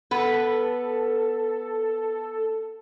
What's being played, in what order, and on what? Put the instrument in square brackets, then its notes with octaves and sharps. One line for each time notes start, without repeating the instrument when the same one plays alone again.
[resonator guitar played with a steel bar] B3 B4 [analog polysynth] A4